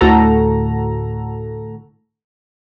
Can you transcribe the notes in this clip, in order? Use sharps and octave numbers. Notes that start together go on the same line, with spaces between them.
D2 A2 F#4 A4 A#5